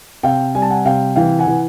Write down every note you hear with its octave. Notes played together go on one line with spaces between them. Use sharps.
C3 F5 G5
G3 G#5
A5
F#5 G#5
C3 F5 G5
E3 F5 G5
F#5 G#5
E3